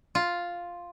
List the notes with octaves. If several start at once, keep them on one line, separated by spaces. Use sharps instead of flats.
F4